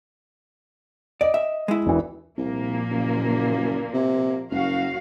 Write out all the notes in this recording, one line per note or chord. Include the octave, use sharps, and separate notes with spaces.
D5 D#5
E5
G#3 E4
E1 E3
C2 A#2 F3 A#3
F#1
C3
F#1 F#2 F#4 F5